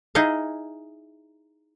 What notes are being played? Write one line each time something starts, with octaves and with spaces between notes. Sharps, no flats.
D#4 E4 G#4 D#5 F5